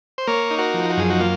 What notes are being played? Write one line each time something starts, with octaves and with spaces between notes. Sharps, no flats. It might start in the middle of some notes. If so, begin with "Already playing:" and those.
C5
A#3 A#4 C#5
D#4
F#4 A#4
F3
F#4
F#2 G#4
D#4 F#4
A#3 F4